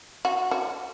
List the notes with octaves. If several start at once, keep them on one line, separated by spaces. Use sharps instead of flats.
F#4
F#4